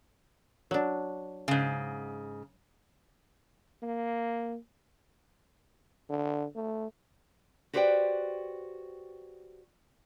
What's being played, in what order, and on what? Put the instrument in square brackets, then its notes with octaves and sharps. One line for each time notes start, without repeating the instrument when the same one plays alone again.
[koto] F#3 D4
[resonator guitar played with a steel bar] G#2 C#3
[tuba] A#3
[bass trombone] D3
A3
[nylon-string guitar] F#4 G4 B4 C5 D5 G5